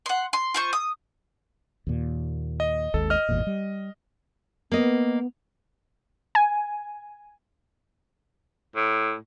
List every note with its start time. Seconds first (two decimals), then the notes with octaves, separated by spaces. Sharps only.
0.06 F#5 C6
0.33 C6
0.54 F4 C5 C#6
0.73 D#6
1.87 D#2 A#2
2.60 D#5
2.94 G#1 D#2 G#2 A4
3.10 D#5 F6
3.29 G#1 E2 A#2
3.47 G3
4.72 A#3 B3 D#5
6.35 G#5
8.76 A2